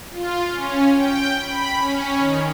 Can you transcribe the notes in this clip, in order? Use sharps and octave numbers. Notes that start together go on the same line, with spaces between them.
F4
C#4
G5
B5
C#4
D#3